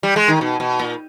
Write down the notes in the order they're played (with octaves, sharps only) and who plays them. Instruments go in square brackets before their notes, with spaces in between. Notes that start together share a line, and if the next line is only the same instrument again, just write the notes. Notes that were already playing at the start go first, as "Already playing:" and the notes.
[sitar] G3
G#3
D#3
B2
B2
A#2